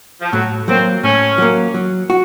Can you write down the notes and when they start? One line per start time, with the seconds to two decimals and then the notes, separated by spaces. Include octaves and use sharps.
0.22 F3
0.33 A2 F#3
0.68 F#3 A#3 C4
1.03 A2 C#4
1.38 F#3 A#3
1.74 F#3
2.10 F#4